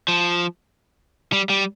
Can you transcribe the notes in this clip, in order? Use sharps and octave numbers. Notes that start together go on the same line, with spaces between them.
F3
G3
G3